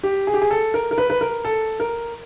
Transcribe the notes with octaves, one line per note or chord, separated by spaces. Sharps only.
G4
G#4
G4
G#4
A4
A#4
A#4
B4
B4
A#4
A4
A#4